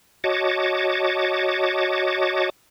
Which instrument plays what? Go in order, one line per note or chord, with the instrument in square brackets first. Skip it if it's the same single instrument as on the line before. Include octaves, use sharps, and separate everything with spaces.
[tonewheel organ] F#4 C#5 D#5 A5 D6